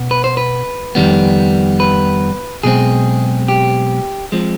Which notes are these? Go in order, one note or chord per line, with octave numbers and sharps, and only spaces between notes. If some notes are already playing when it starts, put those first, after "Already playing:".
Already playing: B2 B3
B4
C5
B4
F2 D#3 G3 B3
B4
B1 B2 G#3 C4 G#4
G4
F3 G#3 C4